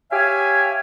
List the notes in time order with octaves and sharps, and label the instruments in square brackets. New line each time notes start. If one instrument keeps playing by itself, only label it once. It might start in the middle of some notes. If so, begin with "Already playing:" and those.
[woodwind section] G4 C#5 E5 F5 G#5